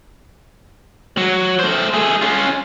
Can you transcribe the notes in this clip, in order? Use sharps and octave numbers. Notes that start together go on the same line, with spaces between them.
F#3
A3 C5
A3 G#4
C#4 F4